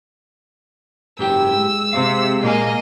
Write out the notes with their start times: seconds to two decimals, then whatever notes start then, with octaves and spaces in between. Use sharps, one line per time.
1.19 F#1 G#2 G4 G5 E6
1.57 G#3
1.93 C3 F5
2.43 A#2 A#3 D#5 G#5